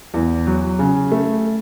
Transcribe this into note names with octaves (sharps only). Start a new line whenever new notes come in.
E2
F#3
C#3
A3